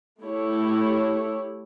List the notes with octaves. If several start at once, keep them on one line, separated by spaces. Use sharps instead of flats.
A3 E4 G4 C#5